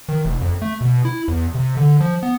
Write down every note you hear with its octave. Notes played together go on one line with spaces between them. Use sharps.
D#3
F1
F2
A3
B2
E4
E2
C3
D3
F3
B3